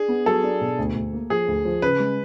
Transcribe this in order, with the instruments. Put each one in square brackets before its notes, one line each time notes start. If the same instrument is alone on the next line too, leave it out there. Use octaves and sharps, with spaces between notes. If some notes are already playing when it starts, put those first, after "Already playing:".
Already playing: [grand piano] D4 [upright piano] G#4
[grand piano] B3
[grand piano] F#3 [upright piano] A4
[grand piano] D4
B2
D2
D2
A#3
[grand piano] F3 [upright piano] G#4
[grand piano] D2
F3
[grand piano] C#3 [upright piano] B4
[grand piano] G#3